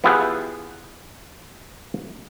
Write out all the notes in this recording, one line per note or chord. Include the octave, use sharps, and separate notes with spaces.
B3 E4 F4 G4 G#4 B4